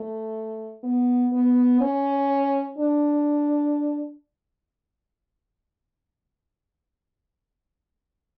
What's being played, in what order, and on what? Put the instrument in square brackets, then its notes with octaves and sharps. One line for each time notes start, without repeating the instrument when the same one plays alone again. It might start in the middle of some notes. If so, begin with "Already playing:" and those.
Already playing: [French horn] A3
B3
B3
C#4
D4